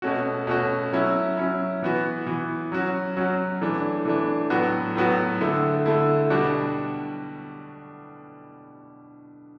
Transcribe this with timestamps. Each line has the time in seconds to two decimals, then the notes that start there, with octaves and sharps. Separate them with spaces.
0.02 B2 A3 C#4 F#4
0.47 B2 A3 C#4 F#4
0.93 F#3 C#4 E4
1.37 F#3 C#4 E4
1.83 E3 B3 F#4
2.27 E3 B3 F#4
2.72 F#3 C#4 F#4
3.17 F#3 C#4 F#4
3.61 E3 A3 D4
4.05 E3 A3 D4
4.50 A2 F#3 B3 F#4
4.95 A2 F#3 B3 F#4
5.41 D3 A3 E4
5.86 D3 A3 E4
6.30 B2 G3 D4 F#4